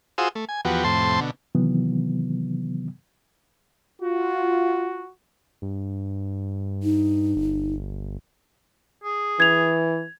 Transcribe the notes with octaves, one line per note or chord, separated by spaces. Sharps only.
F4 F#4 G#4 C5 D#6 E6
A3
G#5
E2 F3 B3 F#4 G4
F2 A2 C3 C5 A5 C6
B2 D3
C3 D#3 E3 F#3 B3
F4 F#4
G2
D#4
G1
G#4
E3 G#6 F7